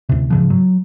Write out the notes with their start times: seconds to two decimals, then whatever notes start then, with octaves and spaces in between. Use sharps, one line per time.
0.09 D2 C3
0.30 G#2 C#3 F3
0.50 F#3